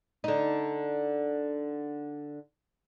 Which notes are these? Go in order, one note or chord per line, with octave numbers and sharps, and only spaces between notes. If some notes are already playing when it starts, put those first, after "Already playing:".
D3 D#4